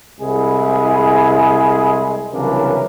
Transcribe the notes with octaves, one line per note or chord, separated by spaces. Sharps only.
C2 G#3 E4 G#4
C2 C#3 E3 F#3 D4 A#4